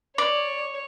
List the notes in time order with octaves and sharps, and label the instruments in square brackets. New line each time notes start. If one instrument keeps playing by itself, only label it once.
[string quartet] C#5 [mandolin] D5